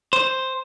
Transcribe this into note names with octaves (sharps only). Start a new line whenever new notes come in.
C5